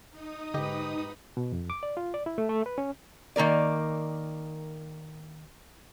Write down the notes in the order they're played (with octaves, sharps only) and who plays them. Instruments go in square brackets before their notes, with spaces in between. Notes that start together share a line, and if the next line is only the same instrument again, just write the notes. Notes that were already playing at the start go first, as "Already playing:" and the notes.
[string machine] D#4 D#6
[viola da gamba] G#2 B4 [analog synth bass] D3 [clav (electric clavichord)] G4 D#5
[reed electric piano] B2
F2
D6
D5
F4
D5
E4
A3
A3
B4
C#4
[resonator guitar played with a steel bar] D#3 A#3 A#4 D5